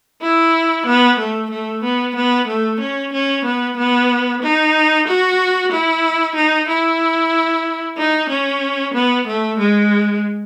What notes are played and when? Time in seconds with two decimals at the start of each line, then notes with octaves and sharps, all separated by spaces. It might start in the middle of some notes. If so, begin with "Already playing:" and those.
0.22 E4
0.87 B3
1.19 A3
1.51 A3
1.84 B3
2.15 B3
2.48 A3
2.80 C#4
3.13 C#4
3.45 B3
3.77 B3
4.43 D#4
5.07 F#4
5.72 E4
6.35 D#4
6.69 E4
7.98 D#4
8.29 C#4
8.94 B3
9.27 A3
9.59 G#3